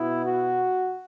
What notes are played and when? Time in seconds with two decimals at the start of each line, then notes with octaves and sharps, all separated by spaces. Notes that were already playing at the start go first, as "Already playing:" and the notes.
Already playing: B2 B3 E4
0.25 F#4